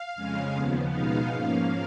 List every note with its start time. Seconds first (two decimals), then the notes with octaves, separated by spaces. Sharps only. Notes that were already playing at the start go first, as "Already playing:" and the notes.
Already playing: F5
0.16 F2 C#3 G#3 C#4
0.53 D#2 C#3 F3 B3
0.91 B2 G#3 B3 D#4 F5
1.28 G#2 F3 A#3 C#4